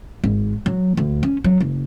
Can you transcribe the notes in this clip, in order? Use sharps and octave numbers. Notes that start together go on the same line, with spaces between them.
G#1
F#3
D2
C#4
F#3
F#1